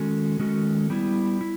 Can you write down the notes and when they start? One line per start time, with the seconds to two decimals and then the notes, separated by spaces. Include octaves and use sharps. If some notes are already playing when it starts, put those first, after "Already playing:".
Already playing: D#3 G#3 C#4 F#4 A4
0.39 D#3 G#3 C#4 F#4 A4
0.90 G3 B3 E4
1.41 E4